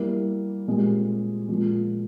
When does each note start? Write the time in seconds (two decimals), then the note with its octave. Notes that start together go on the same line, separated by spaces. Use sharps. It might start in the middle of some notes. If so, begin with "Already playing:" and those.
Already playing: G3 A#3 E4
0.67 A#2 G#3 C4 G4
1.48 A#2 F3 G#3